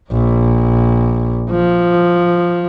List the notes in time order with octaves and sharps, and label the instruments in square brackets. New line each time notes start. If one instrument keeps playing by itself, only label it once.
[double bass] A#1
F3